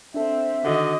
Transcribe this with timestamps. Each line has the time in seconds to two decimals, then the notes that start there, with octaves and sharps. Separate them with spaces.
0.14 C4 D4 A4 E5
0.64 D3 D#3 F#4 D#5 F#5